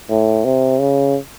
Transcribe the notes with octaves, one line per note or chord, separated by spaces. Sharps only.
A2
C3
C#3